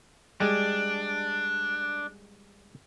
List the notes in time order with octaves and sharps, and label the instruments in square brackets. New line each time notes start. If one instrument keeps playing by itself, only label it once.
[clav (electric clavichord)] G3 G#3 [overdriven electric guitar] D4